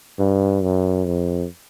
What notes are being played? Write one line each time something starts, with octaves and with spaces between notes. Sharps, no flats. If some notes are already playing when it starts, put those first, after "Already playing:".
G2
F#2
F2